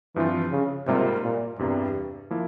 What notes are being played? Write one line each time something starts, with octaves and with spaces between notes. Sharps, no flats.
G2 E3 F3 C4 F4
C#3
G#2 C3 G3 A#3 F4 A#4
A#2
E2 G2 C3 G3
F3 A#3 E4